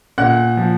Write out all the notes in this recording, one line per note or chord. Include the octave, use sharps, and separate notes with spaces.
A#2 F#5 F#6
F3